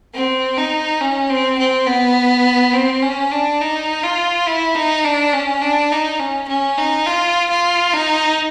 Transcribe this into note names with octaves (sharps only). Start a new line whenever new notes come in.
C4
D#4
C#4
C4
C4
B3
C4
C#4
D4
D#4
F4
E4
D#4
D4
C#4
D4
D#4
C#4
C#4
D#4
F4
F4
D#4